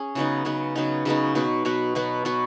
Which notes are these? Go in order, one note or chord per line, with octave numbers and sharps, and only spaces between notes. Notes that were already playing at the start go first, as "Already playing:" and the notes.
Already playing: C#4 G#4
C#3 F#3 B3 D#4
C#3 F#3 B3 D#4
C#3 F#3 B3 D#4
C#3 F#3 B3 D#4
B2 F#3 B3 F#4
B2 F#3 B3 F#4
B2 F#3 B3 F#4
B2 F#3 B3 F#4